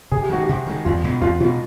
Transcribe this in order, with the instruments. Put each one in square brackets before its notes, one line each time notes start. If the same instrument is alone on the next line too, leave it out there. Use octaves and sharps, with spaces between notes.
[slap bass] C3 [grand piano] G#4
[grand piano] G4
[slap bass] D#3 G#3 [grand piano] F#4
[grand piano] G4
[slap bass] C3
D#3 G#3
[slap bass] E2 [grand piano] F4
[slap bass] B2 G#3
[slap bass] E2 [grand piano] F4
[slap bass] B2 G#3 [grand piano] F4